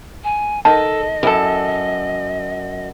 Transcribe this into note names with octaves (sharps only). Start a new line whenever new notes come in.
G#5
D#3 A4 D#5 A5
F#2 E4 A4